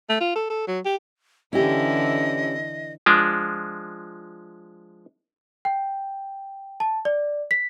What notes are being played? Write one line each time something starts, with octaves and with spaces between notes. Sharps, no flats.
A3
F4
A4
A4
F#3
G4
D3 E3 C#4 E4 G4 D#5
F3 G#3 D4
G5
A5
D5
B6